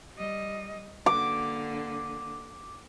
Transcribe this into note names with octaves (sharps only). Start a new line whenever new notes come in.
G3 D#5
D3 A#3 D6